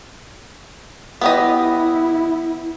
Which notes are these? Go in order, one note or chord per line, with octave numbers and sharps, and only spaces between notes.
B3 E4 G4 D#5